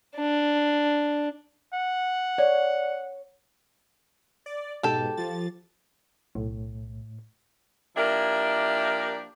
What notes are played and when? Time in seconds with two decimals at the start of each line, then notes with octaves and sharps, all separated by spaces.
0.16 D4
1.74 F#5
2.38 C#5 D5
4.46 D5
4.83 G#2 B2 G4 A4
5.17 F3 A6
6.35 B1 A2
7.96 F3 A#3 D4 E4 G4 A#4